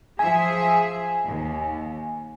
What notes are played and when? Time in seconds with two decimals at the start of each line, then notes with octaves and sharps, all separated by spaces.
0.19 F3 G#4 E5 G#5
1.27 D#2